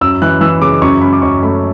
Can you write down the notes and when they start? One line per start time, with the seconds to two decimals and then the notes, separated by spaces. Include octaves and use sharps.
0.01 F#2 E6
0.22 E3 F#6
0.41 E3 E6
0.61 C#3 D6
0.82 F#2 C#6
1.02 C#4 B5
1.13 D6
1.22 F#2 C#6
1.43 A3 B5